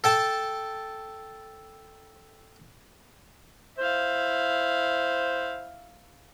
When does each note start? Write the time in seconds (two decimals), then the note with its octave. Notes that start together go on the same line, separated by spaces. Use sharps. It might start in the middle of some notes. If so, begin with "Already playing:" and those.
0.04 A4 G5 A5
3.78 E4 C5 F5